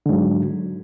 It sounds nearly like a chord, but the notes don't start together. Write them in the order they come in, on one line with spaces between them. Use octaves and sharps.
D3 G#2 F#3